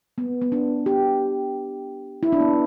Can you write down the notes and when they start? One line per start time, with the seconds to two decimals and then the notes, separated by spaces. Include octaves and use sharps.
0.18 B3
0.42 B3
0.52 D4
0.86 G4
2.23 E4
2.32 D4
2.40 B3